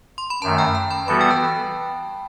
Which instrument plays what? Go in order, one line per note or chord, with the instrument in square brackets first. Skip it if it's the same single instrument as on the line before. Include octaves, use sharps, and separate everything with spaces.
[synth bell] C6
B5
[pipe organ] F#2 D#3 A3 [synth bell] A5
[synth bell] G5
A5
B5
[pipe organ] E3 G3 B3 F#4 A4 [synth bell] B5
[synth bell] G5
A5